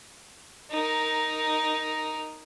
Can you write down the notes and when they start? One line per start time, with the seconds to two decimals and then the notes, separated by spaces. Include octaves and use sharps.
0.70 D#4 A#4